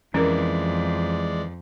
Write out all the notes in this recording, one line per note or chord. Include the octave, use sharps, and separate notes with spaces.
F2 E3 G#3 C#4 A#4 D5